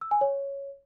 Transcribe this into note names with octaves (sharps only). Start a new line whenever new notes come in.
E6
G#5
C#5